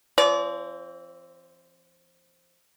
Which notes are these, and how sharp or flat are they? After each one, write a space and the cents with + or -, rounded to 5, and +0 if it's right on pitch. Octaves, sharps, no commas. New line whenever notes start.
F3 -35 C4 +15 D5 -40